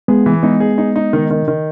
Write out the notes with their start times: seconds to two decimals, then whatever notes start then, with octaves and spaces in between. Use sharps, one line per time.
0.08 G#3 B3 G#4
0.26 E3
0.43 G#3 B3 D#4
0.60 G#4
0.78 D#4
0.96 D#4
1.13 D#3
1.30 D#3
1.48 D#3